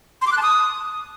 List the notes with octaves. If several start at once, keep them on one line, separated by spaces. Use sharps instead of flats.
C6
D6
F#6
A5
D#6